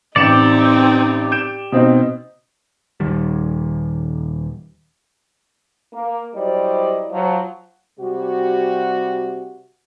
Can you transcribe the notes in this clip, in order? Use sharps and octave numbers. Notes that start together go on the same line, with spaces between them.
A1 C4 D#4 G4 D5 C#7 E7
G6 D7 E7
B2 C4 D#4
D#1 D#3 G3
A#3
F#3 G3 E4 C5 D5 D#5
F3 F#3
C3 G3 F#4